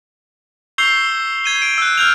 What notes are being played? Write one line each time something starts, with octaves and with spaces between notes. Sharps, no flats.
C#6 E6 G6 C7 F7 G7
G#6 D#7 G7
D7
E6 F#6
F6 G6 F7